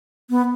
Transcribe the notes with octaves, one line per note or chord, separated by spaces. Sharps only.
B3